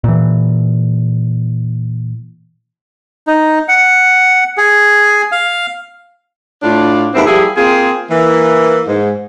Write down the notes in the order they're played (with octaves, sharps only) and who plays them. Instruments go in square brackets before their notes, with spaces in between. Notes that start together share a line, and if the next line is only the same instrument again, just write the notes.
[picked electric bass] A#2 E3
[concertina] D#4
F#5
G#4
F5
[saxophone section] A2 D4 F4
D#2 G#2 B3 C4 E4
F3 G3 A#3 E4 G4 G#4
A#3 C4 F4 G#4
E3 A#3
G#2